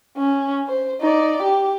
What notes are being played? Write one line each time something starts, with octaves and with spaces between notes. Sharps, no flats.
C#4
C5
D#4 D5
G4